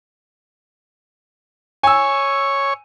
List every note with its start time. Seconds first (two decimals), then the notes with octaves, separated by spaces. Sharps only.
1.83 C#5 G#5 E6